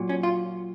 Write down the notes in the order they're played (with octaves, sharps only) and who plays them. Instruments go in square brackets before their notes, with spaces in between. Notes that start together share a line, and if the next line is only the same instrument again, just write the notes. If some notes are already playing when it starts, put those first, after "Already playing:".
Already playing: [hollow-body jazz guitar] A#2 F#3
C#4
F4